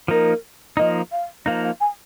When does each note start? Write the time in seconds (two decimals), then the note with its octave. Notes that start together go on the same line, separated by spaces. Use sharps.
0.08 F3 A#3 D#4 A#4
0.77 F3 A#3 D#4 D#5
1.12 F5
1.46 F3 A#3 D#4 F5
1.63 F5
1.80 G#5